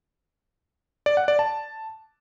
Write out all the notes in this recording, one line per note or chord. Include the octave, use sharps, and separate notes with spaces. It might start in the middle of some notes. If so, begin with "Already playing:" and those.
D5
F#5
D5
A5